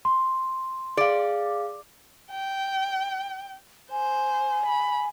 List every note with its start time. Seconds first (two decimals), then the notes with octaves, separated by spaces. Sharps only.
0.05 C6
0.97 G#4 D5 F5
2.31 G5
3.92 C5 G#5
4.66 B5